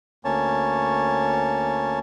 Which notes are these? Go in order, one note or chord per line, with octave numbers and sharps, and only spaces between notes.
D2 A#3 C#4 C#5 A5